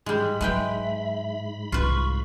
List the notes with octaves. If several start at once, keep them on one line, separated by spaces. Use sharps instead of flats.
G#2 G3 G#3 G#4 B5
F#3 G#3 B4 E5 G5
C2 F4 B4 C#6